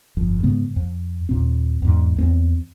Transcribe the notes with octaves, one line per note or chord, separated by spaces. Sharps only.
G1 F2
G#2 C#3 G#3 B3
F2
D#2 A#2 C4
E2 G#2
E2 A#3 C4